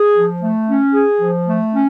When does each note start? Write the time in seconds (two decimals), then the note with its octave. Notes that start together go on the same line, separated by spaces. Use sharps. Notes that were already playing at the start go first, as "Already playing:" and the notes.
Already playing: G#4
0.15 F3
0.42 A3
0.68 C#4
0.94 G#4
1.21 F3
1.47 A3
1.73 C#4